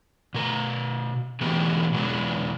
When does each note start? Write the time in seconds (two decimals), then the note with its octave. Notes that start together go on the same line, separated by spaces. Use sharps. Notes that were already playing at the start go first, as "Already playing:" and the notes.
0.34 B2 A#4
1.41 B2 E3 A3 B3 F#4 G4
1.93 B2 F#3 G#3 B3